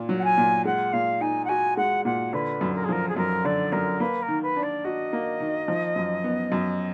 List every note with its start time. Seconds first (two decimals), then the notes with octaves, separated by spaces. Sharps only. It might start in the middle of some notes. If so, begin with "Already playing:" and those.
Already playing: A#2
0.09 F#3
0.19 F#5
0.24 G#5
0.37 A#2
0.65 G#3 F#5
0.93 A#2 F5
1.21 D#4 G#5
1.45 F#5
1.48 F#4 G#5
1.77 G#3 F#5
2.05 A#2 F#5
2.33 D3 B4
2.61 F#2
2.75 A#4
2.84 G#4
2.89 F3 A#4
3.08 G#4
3.17 F#2 A#4
3.45 D3 D5
3.72 F#2 A#4
4.00 A#3 B4
4.22 A#4
4.28 D#3
4.42 B4
4.57 D4
4.63 D5
4.84 F#4 D#5
5.13 A#3
5.40 D#3
5.68 F3
5.96 F#2
6.24 B3
6.52 F#2